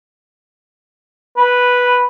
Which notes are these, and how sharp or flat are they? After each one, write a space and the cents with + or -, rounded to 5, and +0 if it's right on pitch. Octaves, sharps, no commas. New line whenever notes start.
B4 -5